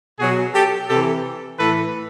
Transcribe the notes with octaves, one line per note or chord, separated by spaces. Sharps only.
B2 F#3 F#4 G#4
G4 A4
C3 E3 G4 A4
A2 E3 A4 B4